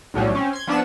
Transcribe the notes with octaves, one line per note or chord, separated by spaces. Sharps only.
B1 A2 F#3 G3
C4 C#4
C6 G#6
F3 B3 D4 F#5 E6 E7